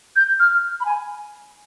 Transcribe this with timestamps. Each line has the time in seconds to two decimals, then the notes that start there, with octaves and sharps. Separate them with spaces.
0.16 G6
0.40 F6
0.80 B5
0.85 G#5